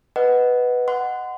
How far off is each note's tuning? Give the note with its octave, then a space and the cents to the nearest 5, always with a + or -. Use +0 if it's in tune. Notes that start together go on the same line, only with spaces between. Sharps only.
B4 +0 D#5 +0 F#5 +0
D#5 -10 F#5 +0 C6 -30